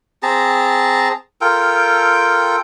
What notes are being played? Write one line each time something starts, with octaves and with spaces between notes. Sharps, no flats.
C4 G#4 A5 A#5
F4 A4 A#4 G5